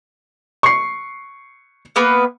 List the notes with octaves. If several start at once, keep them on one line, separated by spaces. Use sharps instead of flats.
C#6 C7
A#3 B3 B4